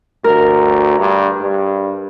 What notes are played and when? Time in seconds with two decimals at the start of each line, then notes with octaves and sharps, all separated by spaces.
0.24 D2 A#4
0.99 G2
1.41 G2